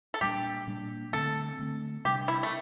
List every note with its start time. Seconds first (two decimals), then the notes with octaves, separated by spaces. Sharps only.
0.14 A4
0.21 A#2 G3 A#3 D4 G4
0.67 A#2 G3 A#3 D4
1.13 D3 A3 C4 A4
1.59 D3 A3 C4
2.05 C3 G3 D4 G4
2.28 E4
2.43 A3